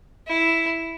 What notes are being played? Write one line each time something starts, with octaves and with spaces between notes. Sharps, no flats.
E4